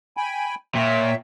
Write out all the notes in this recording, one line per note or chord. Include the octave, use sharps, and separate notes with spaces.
G5 G#5 B5
A#2 C#5 E5 G5